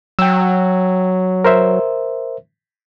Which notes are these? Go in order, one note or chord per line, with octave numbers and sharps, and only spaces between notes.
F#3 G5 E6
A#4 C5 E5